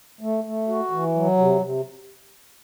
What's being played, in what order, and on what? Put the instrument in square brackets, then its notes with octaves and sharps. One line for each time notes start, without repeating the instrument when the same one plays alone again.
[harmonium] A3
A3
F#4
E3
F#3
C3
C3